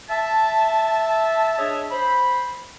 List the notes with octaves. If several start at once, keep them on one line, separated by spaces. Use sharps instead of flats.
E5 A5
D4 G#4 C#5 D#5 E5
C5 B5